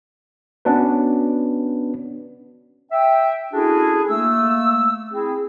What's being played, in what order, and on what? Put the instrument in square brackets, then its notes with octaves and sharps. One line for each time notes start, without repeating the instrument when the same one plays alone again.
[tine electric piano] B3 C#4 D4 F#4 B4
[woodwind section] E5 G5
C#4 D4 E4 F#4 G#4 A4
A3 A#3 E6
C4 E4 G#4